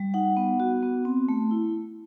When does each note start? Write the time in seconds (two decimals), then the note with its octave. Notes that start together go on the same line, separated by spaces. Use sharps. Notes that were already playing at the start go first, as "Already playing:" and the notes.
Already playing: G3
0.14 D#4 F#5
0.37 B3
0.60 F#4
0.83 B3
1.05 C4
1.29 A3
1.51 E4